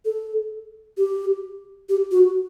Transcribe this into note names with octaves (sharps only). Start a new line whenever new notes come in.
A4
G4
G4
F#4